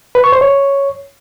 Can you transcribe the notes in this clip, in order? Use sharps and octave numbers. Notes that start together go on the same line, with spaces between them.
B4
C#6
C5
C#5